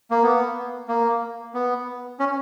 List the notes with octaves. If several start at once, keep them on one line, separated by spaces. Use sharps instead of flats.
A#3
B3
A#3
B3
C#4